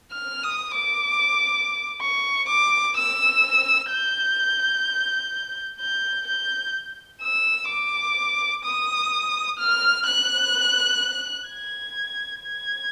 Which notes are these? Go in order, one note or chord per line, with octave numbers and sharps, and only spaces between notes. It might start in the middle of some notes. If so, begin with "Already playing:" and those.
F6
D#6
D6
C#6
D6
E6
G6
G6
G6
E6
D6
D#6
F6
F#6
G#6
G#6